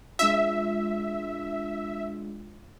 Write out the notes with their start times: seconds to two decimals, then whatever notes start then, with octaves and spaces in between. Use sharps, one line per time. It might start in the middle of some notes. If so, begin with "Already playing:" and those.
0.19 G#3 D4 F4 E5